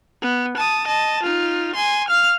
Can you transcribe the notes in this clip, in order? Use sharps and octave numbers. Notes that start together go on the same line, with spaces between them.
B3
A5 D#6
D#5 A5
D#4 F4
G#5 C6
F5 F6